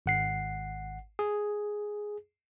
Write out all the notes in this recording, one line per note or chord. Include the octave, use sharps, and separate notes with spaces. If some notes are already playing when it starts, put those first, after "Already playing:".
G#1 F#5 C7
G#4